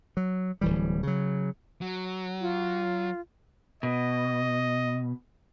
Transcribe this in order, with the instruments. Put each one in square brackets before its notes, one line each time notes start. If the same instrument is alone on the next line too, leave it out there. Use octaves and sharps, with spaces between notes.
[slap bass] F#3
D1 E3 G3
C#3 F#3
[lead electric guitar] F#3
[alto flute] F4
[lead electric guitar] B2 [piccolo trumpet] D#5